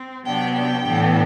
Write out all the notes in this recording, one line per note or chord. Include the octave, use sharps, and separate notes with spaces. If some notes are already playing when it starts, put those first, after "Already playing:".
Already playing: C4
C3 F#3 B3 D4 G5
G5
A2 E3 B3 D4